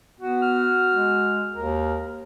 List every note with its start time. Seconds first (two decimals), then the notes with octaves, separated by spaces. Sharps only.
0.20 B3 F#4
0.42 F6
0.92 G#3
1.56 D#2 A#4